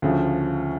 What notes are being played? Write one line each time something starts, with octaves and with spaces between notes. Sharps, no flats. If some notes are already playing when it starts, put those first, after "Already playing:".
D2 C#3 F3